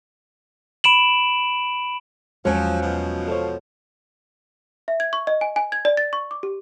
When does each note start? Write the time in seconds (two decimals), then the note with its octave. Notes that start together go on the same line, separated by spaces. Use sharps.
0.84 B5 D7 E7 F#7
2.45 E2 F3 F#3 G#3 C#4
2.82 B2 F3
3.28 A4 C5 C#5
4.88 E5
5.00 G#6
5.13 C#6
5.27 D#5
5.41 G#5
5.56 G#5
5.72 G#6
5.85 D5
5.97 A6
6.13 C#6
6.31 D6
6.43 G4